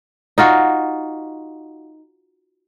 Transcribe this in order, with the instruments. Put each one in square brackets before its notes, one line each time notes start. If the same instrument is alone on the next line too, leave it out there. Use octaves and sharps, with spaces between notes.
[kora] D#4 F4 F#4